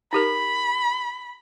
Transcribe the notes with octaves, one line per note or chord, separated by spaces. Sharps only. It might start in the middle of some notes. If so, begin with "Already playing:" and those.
D#4 G4 A#4 B5